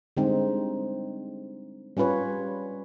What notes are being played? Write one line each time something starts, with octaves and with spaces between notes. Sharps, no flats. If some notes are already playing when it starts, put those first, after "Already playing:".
D3 G3 G#3 C4 D#4
G3 C#4 F4 B4 C#5